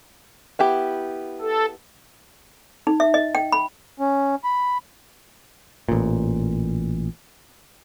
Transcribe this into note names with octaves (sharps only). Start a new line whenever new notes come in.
B3 E4 G4
A4
D#4
E5
D#5
G5
B5
C#4
B5
A1 A#2